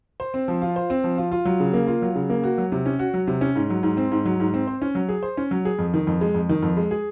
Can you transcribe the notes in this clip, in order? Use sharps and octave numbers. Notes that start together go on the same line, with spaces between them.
C5
C4
F3
F4
C5
C4
F3
F4
F4
F#3
C#3
A#3
F4
F#3
C#3
A#3
F#4
F#3
C3
C#4
F#4
F#3
C3
C#4
G#2
F#3
G#2
C4
G#2
F#3
G#2
C4
C5
C#4
F#3
G#4
C5
C#4
F#3
G#4
F2
D#3
F2
G#3
F2
D#3
F2
G#3
G#4